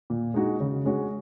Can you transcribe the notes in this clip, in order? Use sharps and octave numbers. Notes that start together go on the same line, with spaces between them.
A#2
G#3 D#4 F#4
C#3
G#3 C#4 F#4